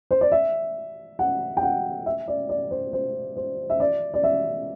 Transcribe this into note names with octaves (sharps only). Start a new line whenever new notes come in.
C5
D5
E5
F#5
G5
F#5
E5
D5
D5
C5
C5
C5
E5
D5
D5
E5